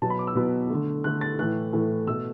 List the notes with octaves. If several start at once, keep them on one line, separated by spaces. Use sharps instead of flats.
B2 F#3 B3 A5
B5
D6
E6
B2 F#3 B3
D3 A3
D3 A3 F#6
A6
A2 E3 A3 F#6
A2 E3 A3
B2 A3 E6